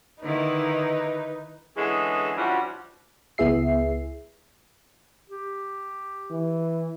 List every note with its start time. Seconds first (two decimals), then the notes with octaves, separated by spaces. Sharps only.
0.23 D3 D#3 D#4 E4 B4
1.77 D3 E3 G#3 C#4 G#4
2.37 E3 F3 G3 C#4 D4 F#4
3.38 C#2 B3 E4 G#4 E5 C7
5.30 G4
6.31 E3